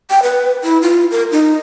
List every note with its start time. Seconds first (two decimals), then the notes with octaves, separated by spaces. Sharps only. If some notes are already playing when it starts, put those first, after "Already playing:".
0.10 G5
0.22 B4
0.63 E4
0.82 F4
1.11 A#4
1.31 D#4